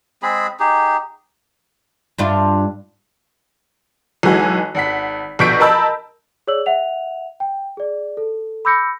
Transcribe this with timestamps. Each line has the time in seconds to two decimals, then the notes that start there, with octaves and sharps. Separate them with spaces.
0.23 G#3 C4 G#4 B5
0.60 D#4 G4 G#4
2.18 G2 D4 F4
4.23 B1 E3 G#3 F#4 G#5
4.75 G#1 F#5 B6
5.39 A#1 B2 C#6 G6 B6 D7
5.60 A#4 D#5 A5 B5 E6
6.47 G#4 C#5 D5 E6 F#7
6.66 E5 F#5 F7
7.40 G5
7.77 G#4 D5
8.17 A4
8.65 B5 D6 E6 G6 A#6 C#7